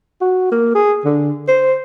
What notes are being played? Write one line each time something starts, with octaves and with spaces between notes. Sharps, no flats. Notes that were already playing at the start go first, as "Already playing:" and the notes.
F#4
A#3
G#4
D3
C5